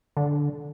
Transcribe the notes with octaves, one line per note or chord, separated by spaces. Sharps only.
D3